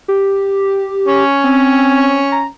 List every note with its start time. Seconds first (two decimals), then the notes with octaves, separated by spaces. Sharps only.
0.08 G4
1.08 C#4
1.44 C4
2.32 A#5